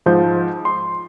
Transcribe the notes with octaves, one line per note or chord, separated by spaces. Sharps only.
G#2 F3 G6
C6